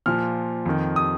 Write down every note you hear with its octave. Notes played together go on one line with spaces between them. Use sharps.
A#2 F3 F6
F2 D#3
D#6